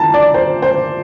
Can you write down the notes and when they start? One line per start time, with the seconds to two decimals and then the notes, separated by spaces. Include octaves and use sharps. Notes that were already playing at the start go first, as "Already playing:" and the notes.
Already playing: E3 A5 A#5
0.14 D5
0.34 C5
0.62 C5